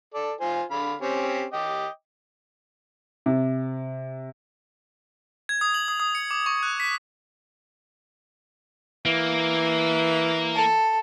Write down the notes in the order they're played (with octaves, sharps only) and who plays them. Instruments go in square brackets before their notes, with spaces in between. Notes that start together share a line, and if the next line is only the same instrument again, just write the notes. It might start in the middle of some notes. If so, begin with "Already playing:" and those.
[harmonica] A4 D5
F4 C5 G#5
D3 F5 B5
C4 C#4 G4
D#5 G5 D6
[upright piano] C3
[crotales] G#6
D#6
F#7
D#6
D#6
C#7
D6
C#6
F#6
B6
[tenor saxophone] E3 [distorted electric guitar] A#3
[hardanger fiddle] A4